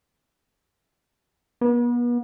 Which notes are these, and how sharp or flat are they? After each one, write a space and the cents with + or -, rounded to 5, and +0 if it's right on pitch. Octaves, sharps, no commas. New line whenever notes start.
B3 -40